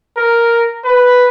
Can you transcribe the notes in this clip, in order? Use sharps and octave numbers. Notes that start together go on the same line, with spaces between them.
A#4
B4